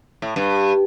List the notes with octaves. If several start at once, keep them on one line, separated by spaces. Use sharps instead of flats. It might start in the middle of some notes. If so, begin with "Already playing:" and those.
A2
G2